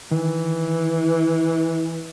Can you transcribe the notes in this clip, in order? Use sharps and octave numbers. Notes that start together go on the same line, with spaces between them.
D#3 E3